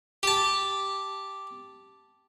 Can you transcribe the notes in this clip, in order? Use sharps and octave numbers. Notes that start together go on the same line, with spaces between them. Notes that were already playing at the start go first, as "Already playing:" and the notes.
G4 A5